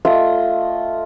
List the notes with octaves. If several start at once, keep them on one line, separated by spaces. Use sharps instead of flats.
A3 F4 D#5 E5